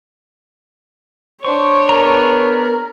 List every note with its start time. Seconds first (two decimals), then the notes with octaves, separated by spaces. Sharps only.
1.45 D4 C5 C#5 C#6
1.89 B3 G#4 A#4 A#5